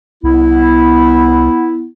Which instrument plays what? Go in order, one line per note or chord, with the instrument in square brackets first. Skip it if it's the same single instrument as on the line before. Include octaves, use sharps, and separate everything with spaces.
[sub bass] C2 [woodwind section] B3 E4